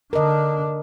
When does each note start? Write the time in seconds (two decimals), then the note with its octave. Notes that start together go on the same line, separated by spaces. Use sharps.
0.13 D3 D4 A#4 D#5